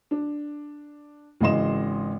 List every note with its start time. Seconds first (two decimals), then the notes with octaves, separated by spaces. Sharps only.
0.11 D4
1.41 G#1 C#3 E3 D#5 C6 E7